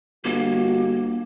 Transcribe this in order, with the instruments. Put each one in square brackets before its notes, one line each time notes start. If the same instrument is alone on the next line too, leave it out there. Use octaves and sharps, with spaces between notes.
[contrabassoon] G1 [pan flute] A#3 [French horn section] F#4